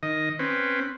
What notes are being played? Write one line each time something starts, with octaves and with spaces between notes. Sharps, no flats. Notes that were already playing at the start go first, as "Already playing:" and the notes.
D#3 D#5
C4 C#4 B4